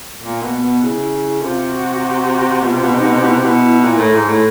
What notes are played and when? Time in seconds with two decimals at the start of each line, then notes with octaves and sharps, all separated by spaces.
0.22 A#2 A#3
0.42 B2
0.53 B3
0.63 B2
0.82 C#3 E4
1.13 E4
1.42 C3 F4
1.73 F#4
2.03 F#4
2.63 B2 F4
2.74 C3
2.84 B2
2.93 C3 D#4
3.04 B2
3.14 C3
3.23 B2 E4
3.34 C3
3.45 B2
3.84 A#2
3.98 A2
4.15 G#2
4.29 A2